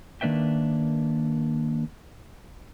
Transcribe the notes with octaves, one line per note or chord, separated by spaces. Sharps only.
D#3 A#3 D4 B4 E5 G5